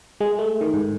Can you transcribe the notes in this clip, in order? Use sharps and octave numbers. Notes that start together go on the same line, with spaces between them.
G#3
A3
D#3
G#2